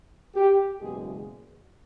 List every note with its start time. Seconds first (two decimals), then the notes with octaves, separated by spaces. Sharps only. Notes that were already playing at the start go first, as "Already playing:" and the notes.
0.34 G4
0.80 F#1 E2 B2 G#3 G#4